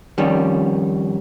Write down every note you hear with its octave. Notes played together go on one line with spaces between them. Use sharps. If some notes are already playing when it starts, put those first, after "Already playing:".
F2 D#3 G3 C#4